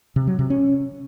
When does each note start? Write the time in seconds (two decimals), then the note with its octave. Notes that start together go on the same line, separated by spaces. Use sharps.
0.16 C3
0.27 F#3
0.39 C3
0.50 C#4